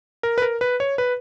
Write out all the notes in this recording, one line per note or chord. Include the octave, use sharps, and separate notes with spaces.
A#4
B4
A#4
B4
C#5
B4